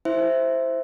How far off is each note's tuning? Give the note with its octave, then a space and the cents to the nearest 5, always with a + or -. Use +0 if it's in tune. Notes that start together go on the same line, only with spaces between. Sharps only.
E4 +0 C5 +0 E5 +0